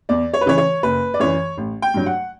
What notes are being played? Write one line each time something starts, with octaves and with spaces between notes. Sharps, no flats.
E2 D5
C#5
B4
C#3 E3 C#5
C#5
F#1 B4
D5
F#2 E3 C#5
A1
G5
G2 F#3
F#5